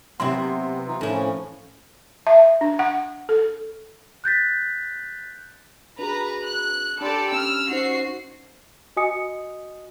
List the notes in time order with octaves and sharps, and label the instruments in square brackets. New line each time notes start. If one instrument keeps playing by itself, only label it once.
[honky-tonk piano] C3 C6 [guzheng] F#3 C4 E4 [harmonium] B3
[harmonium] E3 D#4 F4
[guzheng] A2 E4 [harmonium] E3 F3 C#4
[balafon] E5
D4
F#5
A4
[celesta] F#6 G6 A6 B6
[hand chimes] D4 F#4 G#4 [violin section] B4 A#5
[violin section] F#6
[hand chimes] D4 B5 C6 [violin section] G4 A4 D5
[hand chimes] C#4 [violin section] E6 F6
[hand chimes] C#4 D#4 C5 [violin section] F#4 C7
[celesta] F#4 D#5 G#5 D#6 C#7